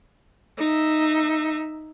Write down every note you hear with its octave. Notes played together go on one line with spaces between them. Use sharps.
D#4 E5